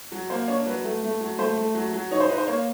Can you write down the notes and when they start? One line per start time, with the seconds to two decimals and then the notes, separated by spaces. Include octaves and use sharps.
0.12 F#3
0.30 A#3 C5
0.48 D4 C#5
0.66 F#3 B4
0.84 A3
1.03 A3
1.21 F#3
1.39 A3 C5
1.57 A3
1.75 F#3
1.93 F#3
2.11 D#4 C#5
2.20 C5
2.29 D#4 B4
2.38 C5
2.47 A#3 C#5